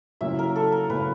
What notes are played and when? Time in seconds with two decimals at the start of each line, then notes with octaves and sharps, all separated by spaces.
0.21 C#3 F#3 A#3 C#4 E4 E5
0.39 A#4
0.56 A4
0.72 A#4
0.89 C#3 F#3 A#3 C#4 E4 B4